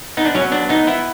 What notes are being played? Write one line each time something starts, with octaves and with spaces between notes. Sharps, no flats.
B3 D#4
D4
F#3 C#4
B3 D4
B3 D#4
B3 E4